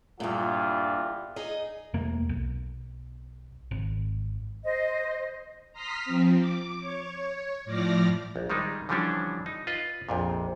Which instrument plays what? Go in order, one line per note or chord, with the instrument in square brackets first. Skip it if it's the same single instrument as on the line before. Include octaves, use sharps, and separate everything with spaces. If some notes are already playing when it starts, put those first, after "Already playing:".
[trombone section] E2 G3 F4 [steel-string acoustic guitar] G2 A#2
[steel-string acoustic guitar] D#4 G#4 D#5
[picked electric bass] E1 A3 A#3
B1
G#1
[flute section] C5 D#5
[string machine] A#5 C6 D#6 F6 B6
F3 C4
D6
C#5
A2 F3 D5 D6 F6 A#6
[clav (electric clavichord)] A#1
D#3 G3 G#3 D#4
D3 E3 F3 G3 C#4 D4
D#4
F4 B4 D#5
A#1 F2 A#2